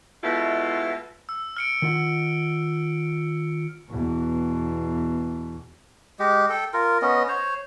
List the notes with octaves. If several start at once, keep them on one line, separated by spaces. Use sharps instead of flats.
B2 G#3 A3 E4 F4
E6
F6 C#7 D7
D#3 F4 F#5
E2 B2
G#3 G4
A4 G5
F4 A#4
B3 C#4 D#5
C5 C#5